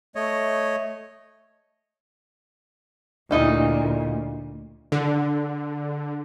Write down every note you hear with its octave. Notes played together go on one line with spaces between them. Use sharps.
A3 C#5 D#5
D2 A#2 A3 D#4 E4
D3